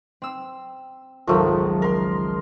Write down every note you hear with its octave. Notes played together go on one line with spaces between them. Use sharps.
C4 E6
G#1 C#2 F3 F#3 A3 A#4
A#4 C6